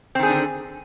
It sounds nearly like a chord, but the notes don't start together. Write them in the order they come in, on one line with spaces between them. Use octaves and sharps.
C4 D#3 G#4 D4 D3